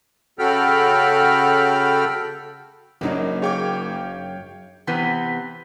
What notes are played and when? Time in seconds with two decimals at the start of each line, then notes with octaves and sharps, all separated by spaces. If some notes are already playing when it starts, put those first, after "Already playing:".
0.39 C#3 F#4 A4 G5 B5 F6
3.01 F#1 F#2 F#3 A#3 D4 D#4
3.42 G#4 C#5 F5 G5 D6
4.87 C3 E3 B3 C4